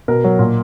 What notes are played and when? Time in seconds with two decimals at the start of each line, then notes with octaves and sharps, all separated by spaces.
0.08 B2 A#4
0.24 F#3
0.39 A#2